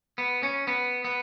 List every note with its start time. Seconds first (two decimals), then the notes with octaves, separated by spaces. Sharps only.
0.18 B3
0.43 C#4
0.67 B3
1.05 B3